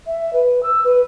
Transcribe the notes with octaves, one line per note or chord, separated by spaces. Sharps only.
E5
B4
E6
B4